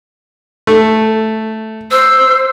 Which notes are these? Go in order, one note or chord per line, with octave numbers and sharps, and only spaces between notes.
A3
C5 E6